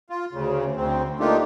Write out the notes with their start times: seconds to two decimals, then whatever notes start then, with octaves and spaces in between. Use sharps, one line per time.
0.10 F4
0.33 D2 C#3
0.76 D2 C4
1.20 A3 A#3 D4 D#4 F4 G4